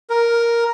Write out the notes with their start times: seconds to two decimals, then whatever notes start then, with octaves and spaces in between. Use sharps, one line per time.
0.10 A#4